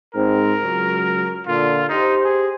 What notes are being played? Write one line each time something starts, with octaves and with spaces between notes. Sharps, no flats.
G#2 C4 A#4
C#2 F#3
A#2 D3 F4
D#4 G4 C5
G#4